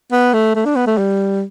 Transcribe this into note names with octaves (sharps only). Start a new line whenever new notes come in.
B3
A3
A3
D4
B3
A3
G3